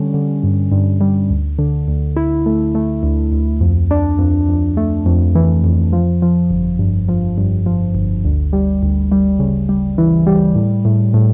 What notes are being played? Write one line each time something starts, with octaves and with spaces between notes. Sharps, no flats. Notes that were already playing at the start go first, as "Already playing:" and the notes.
Already playing: D3 G3 C#4
D3
G2
G2
G3
D2
D3
D2
E4
A3
A3
D2
D2
F2
D4
F2
F2
A3
F2
E3
F2
F3
F3
G1
G2
F3
G2
F3
G1
D2
G3
D2
G3
C#3
G3
E3
G3
A2
A2
A2